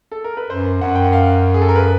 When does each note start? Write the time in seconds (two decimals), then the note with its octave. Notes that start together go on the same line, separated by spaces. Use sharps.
0.12 A4
0.24 A#4
0.37 B4
0.50 F#2 C5
0.81 F#2 F#5
0.95 G5
1.04 F#5
1.13 F5
1.54 G#4
1.61 A4
1.69 A#4
1.76 B4